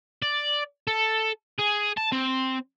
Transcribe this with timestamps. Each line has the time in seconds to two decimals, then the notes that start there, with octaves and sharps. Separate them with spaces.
0.22 D5
0.87 A4
1.59 G#4
1.97 A5
2.12 C4